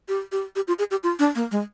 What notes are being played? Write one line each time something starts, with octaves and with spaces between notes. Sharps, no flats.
G4
G4
G4
F4
G#4
G4
F4
D4
A#3
G#3